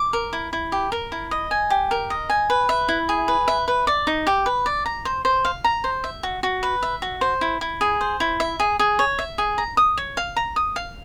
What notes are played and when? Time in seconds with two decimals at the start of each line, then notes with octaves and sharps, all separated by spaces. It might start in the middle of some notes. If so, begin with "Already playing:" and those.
Already playing: D6
0.13 A#4
0.33 E4
0.53 E4
0.72 G4
0.92 A#4
1.12 E4
1.31 D#5
1.51 G#5
1.70 G4
1.91 A#4
2.10 D#5
2.30 G#5
2.50 B4
2.69 E5
2.88 E4
3.09 G#4
3.28 B4
3.48 E5
3.68 B4
3.87 D5
4.07 D#4
4.27 G4
4.46 B4
4.66 D5
4.86 A#5
5.05 C5
5.25 C5
5.45 F5
5.64 A#5
5.84 C5
6.04 E5
6.23 F#4
6.43 F#4
6.63 B4
6.83 E5
7.02 F#4
7.21 C5
7.41 E4
7.61 E4
7.81 G#4
8.01 C5
8.20 E4
8.40 E5
8.60 G#4
8.79 G#4
8.99 C#5
9.19 E5
9.38 G#4
9.58 A#5
9.77 D#6
9.97 C#5
10.17 F5
10.36 A#5
10.56 D#6
10.76 F5